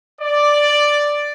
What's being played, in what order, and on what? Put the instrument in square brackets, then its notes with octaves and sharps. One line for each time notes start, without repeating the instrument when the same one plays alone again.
[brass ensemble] D5